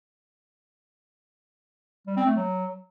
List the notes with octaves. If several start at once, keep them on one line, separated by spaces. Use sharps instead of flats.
G3
C4
A3
F#3